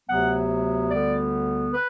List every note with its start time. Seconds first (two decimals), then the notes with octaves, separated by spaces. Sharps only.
0.09 D2 C3 F#3 B3 F#5
0.91 D2 D3 G3 B3 D5
1.74 B4